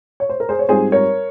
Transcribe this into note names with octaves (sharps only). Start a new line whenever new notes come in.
C#5
C5
A#4
G#4 C5
C#5
G#2 G3 C4 F4 G#4 C5
A#4 C#5